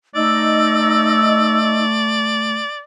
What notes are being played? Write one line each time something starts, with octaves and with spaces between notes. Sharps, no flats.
A3 D#4 D5 D#5 E6